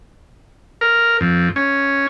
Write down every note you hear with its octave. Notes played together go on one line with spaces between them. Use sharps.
A#4
F2
C#4